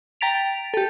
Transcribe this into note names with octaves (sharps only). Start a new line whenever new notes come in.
G5 A#5 A6 B6 D7 F7
G4 A4